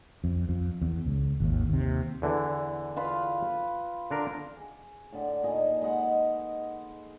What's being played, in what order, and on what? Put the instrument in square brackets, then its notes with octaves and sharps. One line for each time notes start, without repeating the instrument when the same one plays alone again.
[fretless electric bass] F2
F2
E2
C#2
G#1 D#2
D#2 C3
[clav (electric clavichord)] E2 D3 E3
[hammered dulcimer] F4 B4 F5
[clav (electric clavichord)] D3 D4 A#4
[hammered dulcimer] G#4
A2 D3
A#2 D#4 D#5 G#5
G#3 B4 D#5 F#5